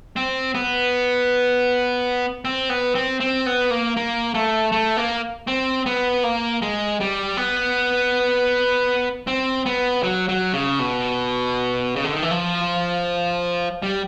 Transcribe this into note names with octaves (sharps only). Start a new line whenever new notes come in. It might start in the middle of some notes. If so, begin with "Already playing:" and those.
C4
B3
C4
B3
C4
C4
B3
A#3
A#3
A3
A3
A#3
C4
B3
A#3
G#3
G3
B3
C4
B3
F#3
F#3
C#3
B2
C#3
D3
D#3
E3
F3
G3